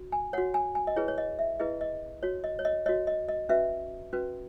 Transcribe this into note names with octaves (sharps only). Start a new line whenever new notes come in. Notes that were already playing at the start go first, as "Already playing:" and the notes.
Already playing: F#4
G#5
F#4 C#5 F#5
G#5
G#5
D#5
E4 G#4 B4 C#5
C#5
D#5
E5
E4 G#4 B4 D#5
D#5
F#4 C#5
D#5
C#5
D#5
F#4 C#5 D#5
D#5
D#5
C#4 F#4 B4 E5
C#4 F#4 B4